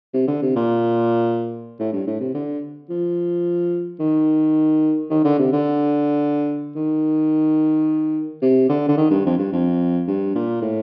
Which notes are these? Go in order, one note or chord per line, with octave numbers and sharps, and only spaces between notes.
C3
D3
C3
A#2
A2
G2
A2
C3
D3
F3
D#3
D#3
D3
C3
D3
D#3
C3
D3
D3
D#3
G2
F2
G2
F2
G2
A#2
A2